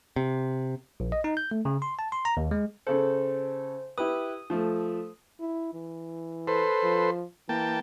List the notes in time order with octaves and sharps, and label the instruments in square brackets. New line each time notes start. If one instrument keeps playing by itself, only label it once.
[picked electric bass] C3
[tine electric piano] A#1
D#5
D#4
G6
A3
C#3
C6
A5
C6
A#5
D#2
G#3
[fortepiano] C#3 A4 [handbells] C5
[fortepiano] E4 G4 B4 [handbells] D#6
[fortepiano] F3 A3
[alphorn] E4
E3
[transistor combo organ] A4 B4 C5
[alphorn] F3
[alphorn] E3 [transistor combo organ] A#3 G5 A5